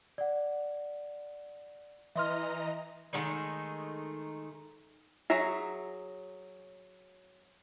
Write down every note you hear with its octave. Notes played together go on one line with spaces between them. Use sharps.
D5 F#5
E3 D#5 E5 A#5 C6 F6
D#3 G#3 A3 D#4
F#3 G#4 E5 A#5